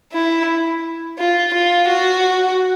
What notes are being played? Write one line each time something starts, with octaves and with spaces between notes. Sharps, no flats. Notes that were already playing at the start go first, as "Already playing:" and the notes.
E4
F4
F4
F#4